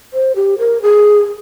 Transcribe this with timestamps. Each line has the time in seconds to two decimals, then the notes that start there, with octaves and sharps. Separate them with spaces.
0.14 C5
0.36 G4
0.59 A#4
0.82 G#4